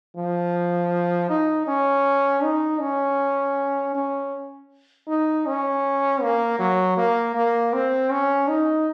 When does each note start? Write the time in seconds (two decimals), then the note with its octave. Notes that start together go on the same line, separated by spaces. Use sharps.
0.16 F3
1.30 D#4
1.67 C#4
2.43 D#4
2.81 C#4
3.95 C#4
5.07 D#4
5.46 C#4
6.22 A#3
6.59 F#3
6.97 A#3
7.35 A#3
7.73 C4
8.11 C#4
8.48 D#4